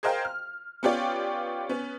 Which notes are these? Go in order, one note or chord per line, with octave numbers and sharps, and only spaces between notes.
G#4 A#4 C5 D#5 F5 G5
F6
B3 C#4 F4 G4 C#5 D5
B3 C#4